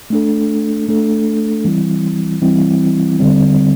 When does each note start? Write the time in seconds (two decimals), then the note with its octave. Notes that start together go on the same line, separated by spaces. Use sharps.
0.10 A3 D4 A4
0.88 A3 D4 A4
1.65 E3 G3 C4 E4
2.42 E3 G3 C4 E4
3.19 D3 G3 C4